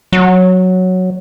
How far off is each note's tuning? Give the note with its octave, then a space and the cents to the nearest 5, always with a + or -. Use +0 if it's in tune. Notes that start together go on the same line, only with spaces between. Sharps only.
F#3 -5